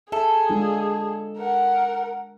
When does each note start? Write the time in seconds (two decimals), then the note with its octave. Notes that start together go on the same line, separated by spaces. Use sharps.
0.12 G#4 A4 E5
0.50 G#3 D4 F4
1.38 A#4 F#5